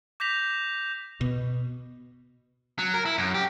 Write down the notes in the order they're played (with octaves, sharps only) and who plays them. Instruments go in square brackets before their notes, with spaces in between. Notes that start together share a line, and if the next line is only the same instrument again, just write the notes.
[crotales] D6 G6 A#6 B6 F7
[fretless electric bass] B2
[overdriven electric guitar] F#3
A#4
E4
F#2
G4